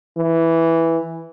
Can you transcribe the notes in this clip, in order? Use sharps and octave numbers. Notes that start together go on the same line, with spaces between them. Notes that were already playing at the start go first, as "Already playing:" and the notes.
E3